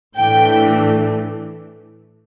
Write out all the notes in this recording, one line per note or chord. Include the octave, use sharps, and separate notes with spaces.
A2 E3 A3 D4 G5